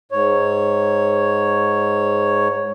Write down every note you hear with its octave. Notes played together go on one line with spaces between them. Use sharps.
G#2 C#5